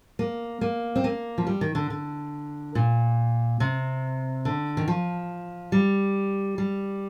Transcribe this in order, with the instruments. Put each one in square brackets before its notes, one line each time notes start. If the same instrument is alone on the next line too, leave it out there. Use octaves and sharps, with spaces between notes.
[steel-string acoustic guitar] A#3
A#3
C4
A#3
F3
G3
D#3
D3
D3
A#2
C3
D3
D#3
F3
G3
G3